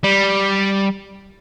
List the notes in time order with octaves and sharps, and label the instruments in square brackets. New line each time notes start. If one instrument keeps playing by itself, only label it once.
[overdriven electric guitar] G3